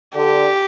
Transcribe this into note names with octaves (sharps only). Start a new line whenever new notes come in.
D3 G4